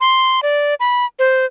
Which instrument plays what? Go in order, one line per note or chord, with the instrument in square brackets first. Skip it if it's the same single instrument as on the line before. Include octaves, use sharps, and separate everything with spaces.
[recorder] C6
D5
B5
C5